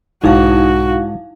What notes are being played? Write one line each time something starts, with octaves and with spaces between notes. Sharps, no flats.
B1 G#2 D#3 D#4 E4 F#4 F5